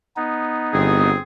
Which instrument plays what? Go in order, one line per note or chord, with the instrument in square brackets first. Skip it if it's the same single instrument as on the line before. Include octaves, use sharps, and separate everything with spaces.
[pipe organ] B3 D#4
[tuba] G1 [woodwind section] C4 G#4